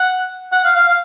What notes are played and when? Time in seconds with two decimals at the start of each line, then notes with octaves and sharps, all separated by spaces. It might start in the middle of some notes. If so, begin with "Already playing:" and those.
Already playing: F#5
0.52 F#5
0.64 F5
0.75 F5
0.87 F5